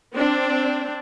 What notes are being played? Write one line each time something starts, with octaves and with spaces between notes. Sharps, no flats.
C4 D4